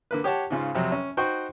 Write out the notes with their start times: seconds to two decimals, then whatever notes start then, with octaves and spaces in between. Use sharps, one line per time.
0.11 D3 A#3 B4
0.24 G4 C#5 F#5 A5
0.50 G#2 C#3 F4
0.75 F2 C3 F#3
0.92 C#4
1.17 D#4 F#4 C5 G5 C#6